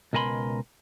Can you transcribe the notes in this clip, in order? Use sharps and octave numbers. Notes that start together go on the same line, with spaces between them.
C#2 B2 A#4 G#5 B5 C6